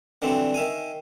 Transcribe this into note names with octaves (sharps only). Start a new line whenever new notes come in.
D3 E3 F#3 G3 C4
D#3 E5 F5 G#5